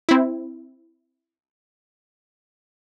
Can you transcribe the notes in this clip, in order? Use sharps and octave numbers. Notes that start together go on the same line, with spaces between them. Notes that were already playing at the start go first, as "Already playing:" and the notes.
C4 E4